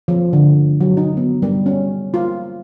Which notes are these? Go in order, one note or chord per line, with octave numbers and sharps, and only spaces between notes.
F3
D3
F#3
D#4
B3
G3
C#4
F4